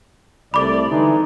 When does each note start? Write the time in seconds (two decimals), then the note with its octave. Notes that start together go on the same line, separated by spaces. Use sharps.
0.54 C2 A3 D5 B5 D6
0.89 D3 E3 G#3 D#4